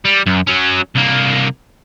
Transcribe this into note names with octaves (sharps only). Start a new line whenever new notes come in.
G3
F#2
F#3 C#4
C2 A#3